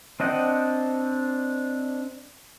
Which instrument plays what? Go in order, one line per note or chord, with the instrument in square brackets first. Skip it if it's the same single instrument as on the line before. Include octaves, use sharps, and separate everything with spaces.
[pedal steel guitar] C4 D4 D#5 F#5 G5